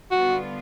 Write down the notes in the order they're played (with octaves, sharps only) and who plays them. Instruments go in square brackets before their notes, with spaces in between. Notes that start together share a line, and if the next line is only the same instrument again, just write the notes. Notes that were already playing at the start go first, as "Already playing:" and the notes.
[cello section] D3 G3 B3 D4 F4 [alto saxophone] F#4